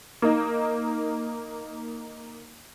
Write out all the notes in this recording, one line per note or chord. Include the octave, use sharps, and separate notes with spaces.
A#3 D#4